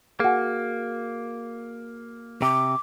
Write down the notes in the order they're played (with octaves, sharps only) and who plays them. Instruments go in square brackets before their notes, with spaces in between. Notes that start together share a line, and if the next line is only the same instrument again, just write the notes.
[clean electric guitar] A#3 [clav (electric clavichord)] F#4 G#4
[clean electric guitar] C3 [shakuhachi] D6